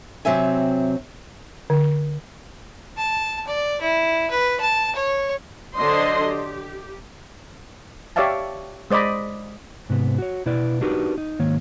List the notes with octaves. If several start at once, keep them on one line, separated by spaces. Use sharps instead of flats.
C3 F#3 C4 E5 G#5
D3
A5
D5
E4
B4
A5
C#5
D3 F#3 D4 C5 D#5 C6
G4
G4 C#5 D5 E5 F5 A5
G#3 C5 D5 D#5 B5
G#2 C3 B3
F#4 C#5
B2 E4 B4 D5
D4 D#4 F#4 G4 A#4 B4
D#4
G#2 D#3 A#3 C#5